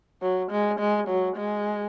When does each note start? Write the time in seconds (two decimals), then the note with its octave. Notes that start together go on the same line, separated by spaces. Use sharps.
0.22 F#3
0.51 G#3
0.80 G#3
1.08 F#3
1.36 G#3